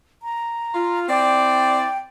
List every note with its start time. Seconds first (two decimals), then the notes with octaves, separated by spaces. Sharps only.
0.23 A#5
0.74 F4
1.09 C4 E4 D5 G5